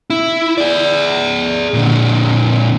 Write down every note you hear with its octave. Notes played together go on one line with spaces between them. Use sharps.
E4
G#4 D5
A#2 D3